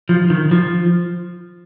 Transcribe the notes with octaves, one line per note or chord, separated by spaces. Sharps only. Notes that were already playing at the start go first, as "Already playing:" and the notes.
F3
D#3
F3